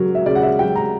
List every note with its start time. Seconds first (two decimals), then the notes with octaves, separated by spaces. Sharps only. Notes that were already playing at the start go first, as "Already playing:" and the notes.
Already playing: C#3 F#3 A#4
0.15 E5
0.26 C#3 D5
0.35 F#5
0.43 E5
0.59 F#3 G5
0.76 A#5